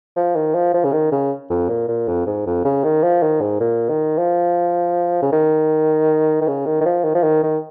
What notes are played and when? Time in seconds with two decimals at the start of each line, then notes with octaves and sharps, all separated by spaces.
0.16 F3
0.36 D#3
0.54 F3
0.74 F3
0.84 C#3
0.92 D#3
1.12 C#3
1.50 F2
1.69 A#2
1.88 A#2
2.08 F2
2.27 G#2
2.46 F2
2.65 C#3
2.84 D#3
3.03 F3
3.23 D#3
3.41 G#2
3.60 A#2
3.89 D#3
4.18 F3
5.22 C#3
5.32 D#3
6.41 D#3
6.47 C#3
6.66 D#3
6.81 D#3
6.86 F3
7.04 D#3
7.15 F3
7.24 D#3
7.43 D#3